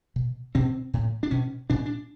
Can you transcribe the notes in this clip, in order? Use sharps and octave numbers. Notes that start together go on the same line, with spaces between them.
B2
B2 C4
A2
D4
B2 C#4
A#2 D4
D4